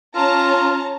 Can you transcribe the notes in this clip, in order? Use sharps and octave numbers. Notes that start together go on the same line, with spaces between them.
C#4 F4 A5 A#5